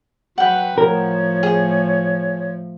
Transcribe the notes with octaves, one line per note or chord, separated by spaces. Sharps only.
F#3 B4 F#5 G5
A2 F3 A#4 C#5
G#4